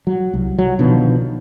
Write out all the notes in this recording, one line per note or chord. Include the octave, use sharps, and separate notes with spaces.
F#3
C2
F#3
B2 D3 D#3 F3